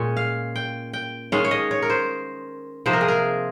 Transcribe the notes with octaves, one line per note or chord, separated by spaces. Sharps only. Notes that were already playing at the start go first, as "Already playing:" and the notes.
Already playing: A#2 G#3 C#4
F5
G5
G5
D#3 G#3 C#4 F5
C#5
D#5
C#5
A#4
C5
C3 F3 A#3 D#4 C5
A#4
G#4
A#4